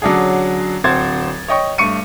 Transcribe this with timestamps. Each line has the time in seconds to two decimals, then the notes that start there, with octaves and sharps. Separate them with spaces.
0.02 D3 F#3 C#4 D4 F#4 G#4
0.84 D1 C4 F#4 C5 G#6 A6
1.48 C#5 D#5 G5 C#6
1.78 G2 A3 C#6 C#7 D#7